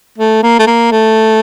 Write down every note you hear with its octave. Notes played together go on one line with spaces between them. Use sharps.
A3
A#3
A3
A#3
A3